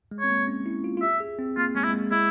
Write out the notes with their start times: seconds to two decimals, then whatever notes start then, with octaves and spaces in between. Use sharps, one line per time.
0.11 G#3
0.20 C4 C#5
0.30 A#3
0.48 C#4
0.66 E4
0.84 F4
0.97 F4
1.02 G4 E5
1.20 G#4
1.39 C4
1.57 A#3 F4
1.75 G#3 C#4
1.84 E4
1.88 G#3
1.93 A#3
2.11 G#3 E4